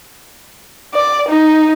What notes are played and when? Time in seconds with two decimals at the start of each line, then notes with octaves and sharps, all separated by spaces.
0.94 D5
1.28 D#4